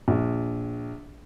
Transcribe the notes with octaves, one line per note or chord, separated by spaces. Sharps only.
A#1